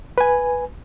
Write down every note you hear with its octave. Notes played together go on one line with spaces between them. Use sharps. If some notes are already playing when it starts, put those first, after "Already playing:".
B4 G#5